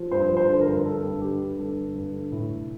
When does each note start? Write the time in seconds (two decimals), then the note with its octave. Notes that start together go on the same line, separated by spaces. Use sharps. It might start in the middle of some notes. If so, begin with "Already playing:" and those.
Already playing: F3
0.11 G2 C5
0.30 F3
0.37 C5
0.49 D3
0.61 A#4
0.68 G2
0.85 D3 A4
1.04 G2
1.21 D3 G4
1.40 D3
1.59 G2 A4
1.76 D3
1.95 G2
2.13 D3
2.32 A2
2.50 A2